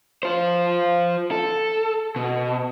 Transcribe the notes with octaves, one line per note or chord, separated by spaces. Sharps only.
F4 C5
A4
B2